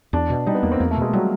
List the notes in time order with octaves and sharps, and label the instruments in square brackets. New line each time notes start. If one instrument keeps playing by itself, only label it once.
[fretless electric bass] E2 [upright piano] D4
[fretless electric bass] B2
[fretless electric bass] G3 [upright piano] D#4
[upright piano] B3
[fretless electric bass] E2 [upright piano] A#3
[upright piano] C4
[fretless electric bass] E2 [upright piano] A#3
[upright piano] A3
[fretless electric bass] B2 [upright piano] G#3
[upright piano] F#3 [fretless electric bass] G3